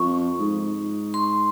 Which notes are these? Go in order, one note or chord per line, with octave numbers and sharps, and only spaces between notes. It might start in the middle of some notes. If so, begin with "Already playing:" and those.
Already playing: F2 C#6
G#2
C6